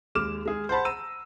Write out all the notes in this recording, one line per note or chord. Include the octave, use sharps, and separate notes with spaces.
D#2 G#3 D6 F6 E7
G#3 G#4
C5 F#5 A5 B5
A#5 E6 D#7